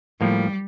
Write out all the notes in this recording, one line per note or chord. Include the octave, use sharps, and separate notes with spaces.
A2 F3 G3 A#3